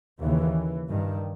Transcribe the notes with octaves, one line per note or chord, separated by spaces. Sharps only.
D#2 C#3 E3
G2 D#3